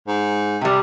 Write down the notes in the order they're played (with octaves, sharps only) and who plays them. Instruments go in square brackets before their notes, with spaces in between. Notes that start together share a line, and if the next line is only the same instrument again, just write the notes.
[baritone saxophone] G#2
[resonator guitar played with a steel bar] C3 G3